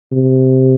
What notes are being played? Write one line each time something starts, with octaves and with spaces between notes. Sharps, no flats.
C3